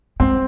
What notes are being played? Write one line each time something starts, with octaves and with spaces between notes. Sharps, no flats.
G#3 C4